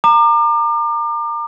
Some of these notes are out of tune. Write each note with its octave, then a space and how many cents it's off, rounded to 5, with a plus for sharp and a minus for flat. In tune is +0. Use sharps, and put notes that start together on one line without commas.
A#5 -15 D6 +35